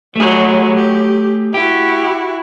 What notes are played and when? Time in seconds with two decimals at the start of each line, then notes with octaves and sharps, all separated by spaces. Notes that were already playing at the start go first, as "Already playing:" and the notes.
0.16 F#3 G3 A3 G#4
0.75 G4
1.54 E4 F#4 G4